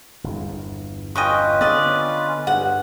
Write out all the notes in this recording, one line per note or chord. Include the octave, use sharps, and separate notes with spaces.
G1 E2
C#4 F4 B4 D#5 G5 C#6
D3 B3 D5 D#5
G2 F#5